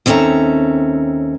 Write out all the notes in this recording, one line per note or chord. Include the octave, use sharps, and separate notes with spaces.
D#2 C4 C#4 A4 E5 A#5